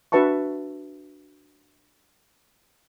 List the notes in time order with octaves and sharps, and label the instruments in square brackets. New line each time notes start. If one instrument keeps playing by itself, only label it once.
[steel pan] D4 F#4 B4 E5 A5 C#6